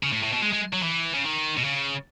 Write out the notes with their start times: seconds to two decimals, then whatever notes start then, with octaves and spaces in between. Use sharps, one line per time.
0.03 C#3
0.13 A2
0.23 A2
0.33 B2
0.42 G#3
0.53 G#3
0.73 F#3
0.83 E3
1.14 C#3
1.25 D#3
1.57 B2
1.64 C#3